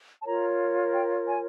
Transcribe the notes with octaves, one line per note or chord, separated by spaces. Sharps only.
A5
F4 A#4 C#5 A#5
G5
G#5